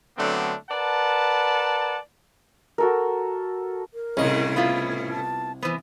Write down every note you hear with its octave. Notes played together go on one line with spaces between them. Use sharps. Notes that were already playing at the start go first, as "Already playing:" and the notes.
D3 F#3 A3 B3 C4 D4
A#4 B4 D5 F#5 A5
F#4 A4 A#4
A#4
C2 A2 C#3 C#4 D#5
B3 E4 F4 F5
A5
E3 B3 C5